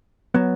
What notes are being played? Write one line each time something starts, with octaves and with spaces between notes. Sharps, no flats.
F#3 B3